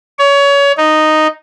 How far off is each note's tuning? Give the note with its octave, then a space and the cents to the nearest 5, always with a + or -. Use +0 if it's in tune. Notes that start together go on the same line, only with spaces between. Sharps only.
C#5 +25
D#4 -5